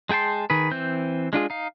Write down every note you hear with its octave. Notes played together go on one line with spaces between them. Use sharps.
G#3 G#4 G5 A5 C6
D#3 G#4 B4
E3 C4 G6
G#3 D4 F4 G#4
D#4 F5